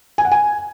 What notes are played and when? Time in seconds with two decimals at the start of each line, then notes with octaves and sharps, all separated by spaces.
0.18 G#5
0.25 F#5
0.31 G#5